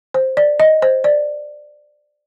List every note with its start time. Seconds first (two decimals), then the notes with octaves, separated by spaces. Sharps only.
0.14 C5
0.37 D5
0.60 D#5
0.82 C5
1.04 D5